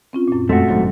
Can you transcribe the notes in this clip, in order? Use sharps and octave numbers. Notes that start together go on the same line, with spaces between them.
C4 C#4 F4
F#2 A#2
F2 G#3 A3 C4 F#4
G#1 G#2 F#3